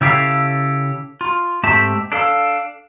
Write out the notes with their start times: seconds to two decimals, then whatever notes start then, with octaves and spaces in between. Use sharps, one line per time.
0.01 C#3 E4 G4 A4 F5
1.21 F4
1.63 G#2 A3 C4 G4 E5 A5
2.12 D4 A4 F5